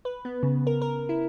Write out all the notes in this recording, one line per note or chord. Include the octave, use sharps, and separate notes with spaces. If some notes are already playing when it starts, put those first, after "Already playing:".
B4
B3
C#3
A#4
A#4
E4